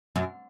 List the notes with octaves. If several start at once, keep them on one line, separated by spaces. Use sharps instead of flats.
F#2